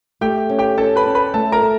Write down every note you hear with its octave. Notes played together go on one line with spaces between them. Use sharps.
A3 G4 G5
C#4
G4 G5
C#4 A4 A5
B4 B5
C#4
B4 B5
A3 A4 A5
A#4 A#5
A3